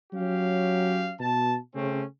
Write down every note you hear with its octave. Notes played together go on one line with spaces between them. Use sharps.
F#3 C#4 G4 F5
B2 A5
C#3 A3 C4 C#4